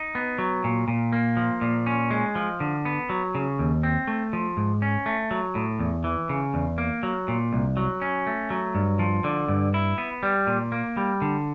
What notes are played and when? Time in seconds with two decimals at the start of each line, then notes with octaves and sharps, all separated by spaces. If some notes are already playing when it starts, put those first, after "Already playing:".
Already playing: D#4
0.15 B3
0.38 F#3
0.64 A#2
0.88 A#2
1.13 A#3
1.37 F3
1.61 A#2
1.86 C#4
2.11 G#3
2.35 F3
2.60 D3
2.85 B3
3.10 F#3
3.35 C#3
3.59 D#2
3.83 C4
4.07 A3
4.33 F3
4.57 G#2
4.82 C#4
5.06 A3
5.31 F#3
5.55 A2
5.80 E2
6.04 E3
6.29 C#3
6.54 E2
6.78 A#3
7.03 F#3
7.28 A#2
7.53 C2
7.77 F#3
8.02 C#4
8.27 A3
8.50 F#3
8.75 G2
8.99 F3
9.24 D3
9.48 G2
9.74 E4
9.98 B3
10.23 G3
10.47 A#2
10.72 A#3
10.97 G3
11.22 D3